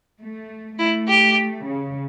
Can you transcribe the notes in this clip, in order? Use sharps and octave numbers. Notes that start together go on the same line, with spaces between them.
A3
A3 E4
G4
C#3